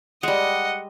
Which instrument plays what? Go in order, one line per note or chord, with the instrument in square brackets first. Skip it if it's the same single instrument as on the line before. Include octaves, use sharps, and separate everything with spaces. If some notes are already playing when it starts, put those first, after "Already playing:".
[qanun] G3 G#3 [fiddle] D#5 [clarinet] F#5